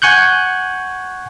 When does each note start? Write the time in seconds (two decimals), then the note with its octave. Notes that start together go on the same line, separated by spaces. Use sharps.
0.02 F#5 G#5 C#6 F#6 G6